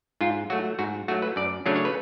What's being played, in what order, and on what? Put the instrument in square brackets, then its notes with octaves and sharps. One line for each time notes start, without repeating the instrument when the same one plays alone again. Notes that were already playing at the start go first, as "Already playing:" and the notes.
[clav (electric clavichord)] G#2 F4
F#3 A3 F#4
G#2 F#4
F#3 A3 F#4
B4
F#2 D5
C#3 F#3 A3 D4 C#5
C#5
B4